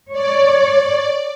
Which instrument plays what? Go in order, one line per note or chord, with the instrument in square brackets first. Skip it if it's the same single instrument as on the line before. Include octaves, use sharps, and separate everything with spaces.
[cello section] C#5 [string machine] D5